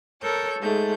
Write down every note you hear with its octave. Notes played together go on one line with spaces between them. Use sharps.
A4 A#4 C#5 G6
G#2 A3 G6